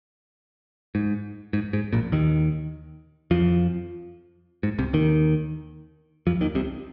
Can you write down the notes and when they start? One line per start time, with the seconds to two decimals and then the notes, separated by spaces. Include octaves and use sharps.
0.95 G#2
1.53 G#2
1.73 G#2
1.93 A#1 A#2
2.12 D#2 D#3
3.31 F2 F3
4.63 G#2
4.78 C2 C3
4.93 D#2 D#3
6.27 F2 F3
6.41 D#2 D#3
6.55 C2 C3